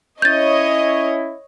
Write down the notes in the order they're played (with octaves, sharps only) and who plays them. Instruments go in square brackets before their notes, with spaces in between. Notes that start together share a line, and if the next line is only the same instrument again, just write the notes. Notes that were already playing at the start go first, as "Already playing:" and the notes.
[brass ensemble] C#4 E4 [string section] C#5 D#5 [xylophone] G6 A6